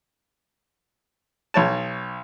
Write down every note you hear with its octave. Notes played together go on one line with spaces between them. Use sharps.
B1 C#5 A5